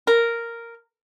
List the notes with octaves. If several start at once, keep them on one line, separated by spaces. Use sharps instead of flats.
A#4